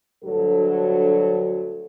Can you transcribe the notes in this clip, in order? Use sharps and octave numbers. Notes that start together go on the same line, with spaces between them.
D2 G2 F#3 A4